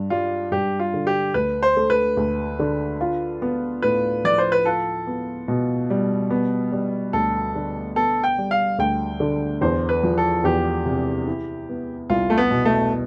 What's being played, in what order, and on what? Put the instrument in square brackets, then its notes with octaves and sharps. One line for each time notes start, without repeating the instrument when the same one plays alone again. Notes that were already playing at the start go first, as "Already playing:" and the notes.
Already playing: [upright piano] G2
[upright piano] G3 [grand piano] F4
[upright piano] G2 [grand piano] G4
[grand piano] F4
[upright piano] D3
[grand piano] G4
[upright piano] D2 [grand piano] B4
[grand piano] C5
[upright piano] A3
[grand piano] B4
[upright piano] D2
D3
F4
B3
[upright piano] A2 [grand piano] B4
[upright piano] F3 [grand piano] D5
[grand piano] C5
B4
[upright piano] F4 [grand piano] A4
[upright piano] B3
B2
G3
B3
G3
[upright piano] D2 [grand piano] A4
[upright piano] D3
[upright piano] B3 [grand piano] A4
[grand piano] G5
[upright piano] G3
[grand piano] F5
[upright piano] D2 [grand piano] G5
[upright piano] D3
[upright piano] E2 [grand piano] C5
[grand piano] B4
[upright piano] F3
[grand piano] A4
[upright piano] E2 [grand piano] G4
[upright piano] C3
E4
B3
[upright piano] C2 [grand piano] F4
[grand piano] A3
B3
[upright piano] B2
[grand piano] A3